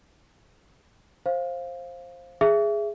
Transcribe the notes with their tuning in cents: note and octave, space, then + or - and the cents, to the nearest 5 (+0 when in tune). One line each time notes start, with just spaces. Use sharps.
C5 +15 F5 +0
G#4 +0 E5 +20